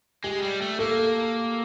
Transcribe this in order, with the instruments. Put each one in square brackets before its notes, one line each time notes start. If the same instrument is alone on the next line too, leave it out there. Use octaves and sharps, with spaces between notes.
[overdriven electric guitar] G#3 [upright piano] G4
[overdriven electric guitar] G3
A3
[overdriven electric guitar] A#3 [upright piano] A4